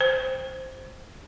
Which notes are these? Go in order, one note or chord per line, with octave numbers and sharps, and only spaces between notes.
C5